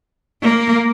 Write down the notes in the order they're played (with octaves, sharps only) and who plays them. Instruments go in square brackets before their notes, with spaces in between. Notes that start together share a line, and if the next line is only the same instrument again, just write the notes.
[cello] A#3